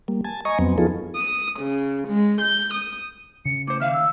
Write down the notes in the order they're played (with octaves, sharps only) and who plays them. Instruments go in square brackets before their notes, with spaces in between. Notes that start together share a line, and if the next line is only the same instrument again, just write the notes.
[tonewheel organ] G3 A#3
G#5 A5
D#5 G#5 A#5 C#6
F2 F#3 B3 C4
F3 B3 D#4 F4 G#4 A4
[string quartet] D#6
C#3
G#3
G6
D#6
[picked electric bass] C#3 [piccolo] C#7
[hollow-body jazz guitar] A2 C5 [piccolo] D6
[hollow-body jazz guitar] D#2 E5 F5 [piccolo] F6
[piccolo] E6